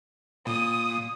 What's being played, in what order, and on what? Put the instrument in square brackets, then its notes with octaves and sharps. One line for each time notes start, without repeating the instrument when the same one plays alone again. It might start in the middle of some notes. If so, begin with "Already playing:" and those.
[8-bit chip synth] A#2 [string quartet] D#6